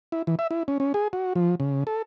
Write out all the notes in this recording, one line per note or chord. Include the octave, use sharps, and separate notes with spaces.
E4
E3
E5
E4
C#4
C#4
G#4
F#4
F3
C#3
A4